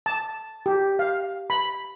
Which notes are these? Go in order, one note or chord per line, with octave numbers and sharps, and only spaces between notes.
A5
G4
F5
B5